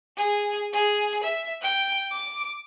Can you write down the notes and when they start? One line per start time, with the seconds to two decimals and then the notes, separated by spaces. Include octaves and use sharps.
0.17 G#4
0.73 G#4
1.24 E5
1.62 G5
2.11 D6